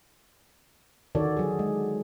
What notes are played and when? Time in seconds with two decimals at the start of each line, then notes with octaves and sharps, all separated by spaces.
1.15 D3 D#3 F#4 A4 C#5 D5
1.37 F#3 G#4
1.59 G#3